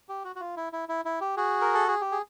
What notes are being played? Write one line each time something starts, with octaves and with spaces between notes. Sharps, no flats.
G4
F#4
F#4
F4
E4
E4
E4
E4
G4
F#4 G#4
A#4
A4
G#4
G4
G#4